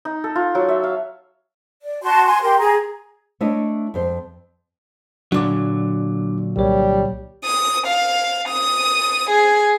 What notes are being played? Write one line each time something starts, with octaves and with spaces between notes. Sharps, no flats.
D#4
A4
F4
F#3
E5
F5
D5
F#4 A5 C6
G#5 C6
G4 A#4 C6
G#4 A#5
A3 D4 E4 C#5 D#5
F2 C5
A#2 D3 F#3 D4 D6
C2 G3 C#5
D#6
F5
D#6
G#4